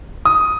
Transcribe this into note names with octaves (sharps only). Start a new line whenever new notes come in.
D#6